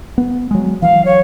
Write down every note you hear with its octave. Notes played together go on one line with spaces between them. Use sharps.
B3
F#3 G#3
E3 F#3 F5
C#5